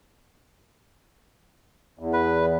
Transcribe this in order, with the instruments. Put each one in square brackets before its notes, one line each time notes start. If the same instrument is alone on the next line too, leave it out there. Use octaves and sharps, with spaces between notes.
[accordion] E2
[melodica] B4